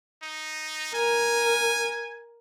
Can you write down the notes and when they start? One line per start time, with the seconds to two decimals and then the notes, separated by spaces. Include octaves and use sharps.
0.23 D#4
0.95 A#4 G#5